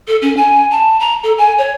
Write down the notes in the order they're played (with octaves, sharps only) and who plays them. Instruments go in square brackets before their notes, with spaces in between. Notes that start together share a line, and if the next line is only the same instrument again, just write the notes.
[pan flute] A4
C#4
G#5
A5
A#5
A4
G#5
C#5